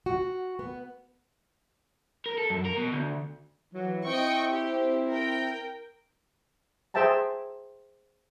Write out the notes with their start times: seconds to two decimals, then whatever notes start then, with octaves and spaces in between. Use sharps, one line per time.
0.06 F#4
0.59 B3
2.26 A#4
2.38 A4
2.50 F#2
2.65 A#4
2.77 B2
2.92 D2
3.74 E3 F#3
4.05 C4 E4 D#5 G5 C#6
4.49 G4
5.09 A#4 G5
6.94 G#4 C5 E5 G5 A5 A#5